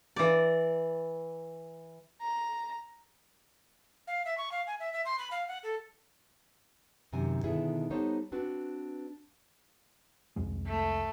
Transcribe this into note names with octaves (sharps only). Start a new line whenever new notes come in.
E3 D5
A#5
F5
E5
C#6
F5
G#5
E5
E5
C6
B5
F5
F#5
A4
F#2 C3 D#3 G#5
B2 D3 D#3 B3 E4 G#4
G3 B3 D#4 A4 C5 C#5
C4 D4 F#4 B4
C2 F2 G#3
A3